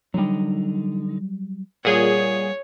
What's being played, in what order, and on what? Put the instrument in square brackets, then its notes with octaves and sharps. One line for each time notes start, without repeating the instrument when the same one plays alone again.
[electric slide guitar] D3 D#4 [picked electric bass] F#3 G3
[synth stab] A#2 G#4 [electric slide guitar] G3 F#5 [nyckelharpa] C#5